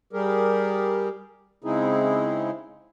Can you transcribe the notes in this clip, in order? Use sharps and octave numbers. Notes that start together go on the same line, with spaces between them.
G3 G4 G#4 A#4
C#3 G#3 C4 D#4 E4 G#4